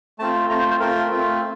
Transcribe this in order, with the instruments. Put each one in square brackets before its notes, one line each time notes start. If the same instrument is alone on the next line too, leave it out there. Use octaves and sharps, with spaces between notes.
[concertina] A3 C4 F4 A5
A3 C4 F4 A#5
C5
C5
A3 C4 F4 A#4
A3 C4 F4